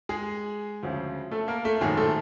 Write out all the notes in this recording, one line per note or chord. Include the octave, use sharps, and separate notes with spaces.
G#3 G#4
D2 C#3 F3
A3 A4
A#3 A#4
A3 A4
A#1 G#2 D#3 F#3 G#3 G#4
A3 A4